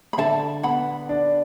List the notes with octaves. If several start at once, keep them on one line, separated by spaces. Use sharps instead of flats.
B5
D3 E5 A5
B3 F#5 B5
D4